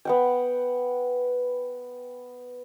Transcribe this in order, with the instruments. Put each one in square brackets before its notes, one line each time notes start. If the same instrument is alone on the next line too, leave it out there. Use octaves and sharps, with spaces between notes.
[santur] B3 F#5 G5